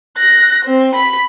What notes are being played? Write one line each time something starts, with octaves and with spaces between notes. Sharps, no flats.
F#6 A#6
C4
B5 B6